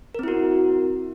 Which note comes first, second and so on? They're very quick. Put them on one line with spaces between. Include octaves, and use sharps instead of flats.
A#4 C4 E4 F#4